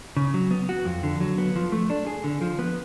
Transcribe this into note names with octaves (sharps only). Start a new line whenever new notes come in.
C#3
F#3
B3
F#4
F2
D3
F#3
B3
F3
A3
D4
G#4
D3
F3
B3